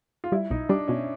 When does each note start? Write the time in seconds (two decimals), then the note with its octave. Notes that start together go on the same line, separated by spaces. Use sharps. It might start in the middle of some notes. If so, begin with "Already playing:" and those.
0.24 F4
0.32 G3 E4
0.51 B1 D#4
0.69 G3 D4
0.88 B2 C#4